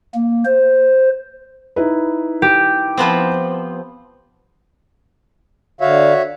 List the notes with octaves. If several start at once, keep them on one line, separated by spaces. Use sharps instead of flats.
A#3
C5
D#4 E4 B4
G4
F3 B3 C4
D3 F#4 C#5 E5 F5